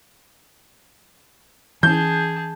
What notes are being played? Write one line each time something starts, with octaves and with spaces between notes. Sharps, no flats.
E3 C#4 G#4 A5 G6